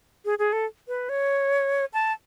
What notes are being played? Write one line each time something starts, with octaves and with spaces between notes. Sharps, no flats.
G#4
G#4
A4
B4
C#5
A5